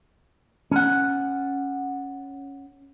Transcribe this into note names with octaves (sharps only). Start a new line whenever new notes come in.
C#4 F#5